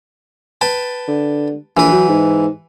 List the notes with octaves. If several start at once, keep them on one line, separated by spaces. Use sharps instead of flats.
B4 G5 A5
D3
A#1 E3 B4
F#3
G#2